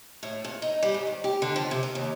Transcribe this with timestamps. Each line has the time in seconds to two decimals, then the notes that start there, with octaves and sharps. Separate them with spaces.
0.23 A2
0.44 F2
0.62 D#4
0.83 G3
0.94 G#2
1.07 D#3
1.24 G4
1.42 D3
1.56 F3
1.71 C3
1.83 A#3
1.95 D#2